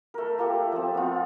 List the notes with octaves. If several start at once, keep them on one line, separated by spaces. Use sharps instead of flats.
A3 A#4
A3 A#3 F4 G4
F3 C4
B3 F4